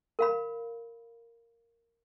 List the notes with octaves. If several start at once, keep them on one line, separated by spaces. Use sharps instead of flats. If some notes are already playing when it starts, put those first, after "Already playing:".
A#4 F5 B5